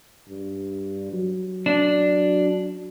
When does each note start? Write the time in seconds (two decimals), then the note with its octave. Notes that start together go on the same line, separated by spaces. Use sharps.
0.28 G2
1.13 F#3
1.66 D4